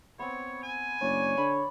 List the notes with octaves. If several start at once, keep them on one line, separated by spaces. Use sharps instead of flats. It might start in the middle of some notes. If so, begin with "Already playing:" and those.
B3 C4 C#5
G#5
F#1 D4 C#5 D5
D3 B5